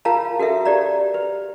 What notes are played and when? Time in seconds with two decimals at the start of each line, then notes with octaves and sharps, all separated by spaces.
0.05 F4 A#4 F5 A5 A#5
0.39 F#4 A4 A#4 E5 F5
0.65 G4 D5 A#5
1.14 B4